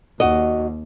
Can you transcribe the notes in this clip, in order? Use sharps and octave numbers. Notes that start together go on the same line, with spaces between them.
D#2 F#4 D#5